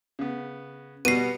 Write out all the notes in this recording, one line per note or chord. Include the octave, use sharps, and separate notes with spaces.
C#3 B3
B2 G3 B3 F#4 C7 D#7